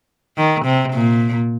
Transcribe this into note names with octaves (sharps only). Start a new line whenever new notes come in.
D#3
C3
A#2